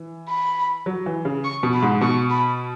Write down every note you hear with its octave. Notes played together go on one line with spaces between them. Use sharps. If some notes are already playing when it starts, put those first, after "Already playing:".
Already playing: E3
B5
F#3
E3
C#3
C#6
B2
B5
G#2
B2 C#6
B5